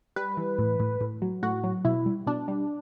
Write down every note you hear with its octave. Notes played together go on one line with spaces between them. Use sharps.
G3 B4
E3
A2
A2
A2
F#3
A2 F#4
F#3
B2 E4
G3
B2 D4
G3